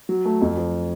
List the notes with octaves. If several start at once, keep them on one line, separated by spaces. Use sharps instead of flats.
F#3
A3
F2
F3